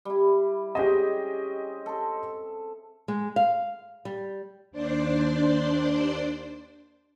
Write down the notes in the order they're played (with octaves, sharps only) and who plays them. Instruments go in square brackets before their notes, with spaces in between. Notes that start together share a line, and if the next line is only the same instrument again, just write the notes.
[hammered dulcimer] G3 E4
[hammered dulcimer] C4 C#4 G#4 [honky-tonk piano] G4 D#5
[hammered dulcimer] A4 C6
[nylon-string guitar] G#3
F5
G3
[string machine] D#2 D4 C5 D5 C6